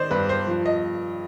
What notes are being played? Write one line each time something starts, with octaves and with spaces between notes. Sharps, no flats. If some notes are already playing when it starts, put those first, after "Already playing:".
Already playing: D#3 C5 D5 D#5
G2 B4
C5
F3
D#5